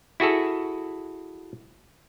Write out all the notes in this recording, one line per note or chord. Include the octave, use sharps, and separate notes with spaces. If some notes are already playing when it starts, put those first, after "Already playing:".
E4 F#4 G#4 A4